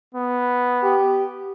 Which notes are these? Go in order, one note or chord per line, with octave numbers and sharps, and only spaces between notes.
B3
G4